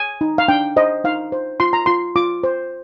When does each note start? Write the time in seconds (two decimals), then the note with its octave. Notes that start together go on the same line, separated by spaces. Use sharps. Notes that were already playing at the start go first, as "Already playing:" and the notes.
Already playing: G#5
0.21 D#4
0.38 F5
0.48 D4 G5
0.76 C5 D#5
1.04 D#4 F5
1.32 C5
1.60 F4 C6
1.73 A#5
1.86 F4 C6
2.16 F4 D6
2.44 C5